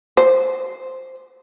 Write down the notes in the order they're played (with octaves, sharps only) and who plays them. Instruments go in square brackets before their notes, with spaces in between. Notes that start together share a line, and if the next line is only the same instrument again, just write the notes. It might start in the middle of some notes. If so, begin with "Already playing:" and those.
[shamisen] C5